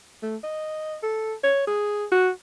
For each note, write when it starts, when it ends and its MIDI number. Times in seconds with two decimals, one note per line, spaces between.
0.22 0.36 57
0.44 0.96 75
1.03 1.34 69
1.44 1.65 73
1.67 2.05 68
2.12 2.29 66